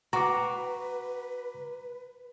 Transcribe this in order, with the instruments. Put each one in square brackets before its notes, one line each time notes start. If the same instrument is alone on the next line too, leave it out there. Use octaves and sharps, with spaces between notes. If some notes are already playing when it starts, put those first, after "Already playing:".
[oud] F#4 [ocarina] B4 [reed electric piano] A#5 D6